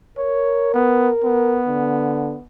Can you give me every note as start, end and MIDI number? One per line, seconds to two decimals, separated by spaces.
0.17 1.61 70
0.17 0.72 73
0.74 1.10 59
1.24 2.44 59
1.68 2.36 50